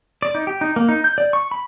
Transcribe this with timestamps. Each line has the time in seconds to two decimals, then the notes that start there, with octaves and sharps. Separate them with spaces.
0.22 D5
0.35 D#4
0.47 G4
0.61 D#4
0.76 A#3
0.89 D#4
1.04 G6
1.18 D5
1.33 C#6
1.51 B5